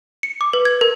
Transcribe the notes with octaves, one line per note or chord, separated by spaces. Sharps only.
C#7
D6
B4
G#6
A#4